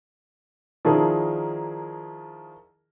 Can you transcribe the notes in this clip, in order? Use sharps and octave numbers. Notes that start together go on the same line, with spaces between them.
D#3 F3 D4 E4 G#4 A#4